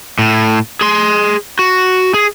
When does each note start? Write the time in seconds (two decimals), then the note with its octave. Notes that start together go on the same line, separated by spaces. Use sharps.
0.19 A2
0.81 G#4 C6
1.59 F#4
2.14 G#4